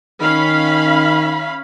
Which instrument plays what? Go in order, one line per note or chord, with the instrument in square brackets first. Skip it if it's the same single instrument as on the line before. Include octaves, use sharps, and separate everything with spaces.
[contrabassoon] D#3 [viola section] C#4 F5 B5